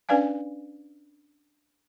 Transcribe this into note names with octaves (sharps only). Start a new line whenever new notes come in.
C#4 D4 B4 D5 F5 G#5